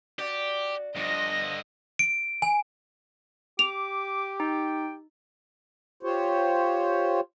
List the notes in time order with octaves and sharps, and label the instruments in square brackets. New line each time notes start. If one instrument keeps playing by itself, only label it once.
[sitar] F#4 D5 [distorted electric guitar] G4
[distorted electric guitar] G2 D3 [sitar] F3 [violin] D#5 A#6
[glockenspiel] D7
G#5
[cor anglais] G4 [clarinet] D6 [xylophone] F7
[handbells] D#4 [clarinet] G5
[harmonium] F4 G4 C5 C#5